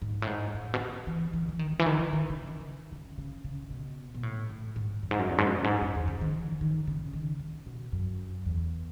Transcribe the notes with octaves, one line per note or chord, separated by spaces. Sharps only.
G#2
A2
G#2
A2
B2
C#3
E3
E3
E3
D#3
C#3
E3
D#3
E3
D#3
C#3
D#3
C#3
C#3
C#3
B2
B2
A2
A2
G#2
F#2
G#2
F#2
E2
G#2
F#2
F#2
G#2
F#2
E2
C#3
D#3
E3
D#3
C#3
D#3
C#3
B2
F#2
E2